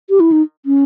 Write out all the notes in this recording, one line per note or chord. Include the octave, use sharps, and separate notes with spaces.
G4
E4
D#4
C#4